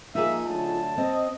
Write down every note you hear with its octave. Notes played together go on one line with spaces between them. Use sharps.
F3 A#3 D#4 F4 G#4 E5
D3 F#3 A3 A5
C4 D#5